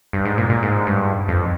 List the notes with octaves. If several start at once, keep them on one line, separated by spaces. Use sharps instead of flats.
G2
G#2
A#2
A#2
G#2
G2
F2